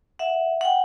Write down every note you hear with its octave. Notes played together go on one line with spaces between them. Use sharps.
E5 F#5
F#5 G5